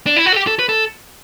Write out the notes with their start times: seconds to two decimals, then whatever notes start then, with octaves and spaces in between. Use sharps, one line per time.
0.06 D4
0.16 E4
0.26 F#4
0.33 A4
0.36 G4
0.47 A4
0.59 B4
0.69 A4